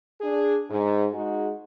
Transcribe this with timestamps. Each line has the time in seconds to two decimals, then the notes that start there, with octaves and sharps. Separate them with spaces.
0.20 D4 G#4
0.70 G#2
1.12 G#3 D#4 F#4 G#4